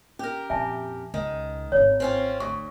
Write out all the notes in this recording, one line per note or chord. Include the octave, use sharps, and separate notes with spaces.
C#4 G4 A#4
F2 A#2 E5 G#5 A5
C#2 D#3
D#1 G#1 C#5
C4 C#4 F4
D2 C#6